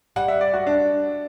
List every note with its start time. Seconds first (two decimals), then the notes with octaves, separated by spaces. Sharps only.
0.16 G3 F#5
0.28 E5
0.41 D5
0.54 F#4
0.67 D4